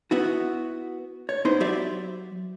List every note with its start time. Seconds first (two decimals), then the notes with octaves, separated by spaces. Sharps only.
0.11 B3 E4 F#4
1.29 C#5
1.45 B3 D#4 E4 C5 C6
1.60 F#3 G4 D5 E5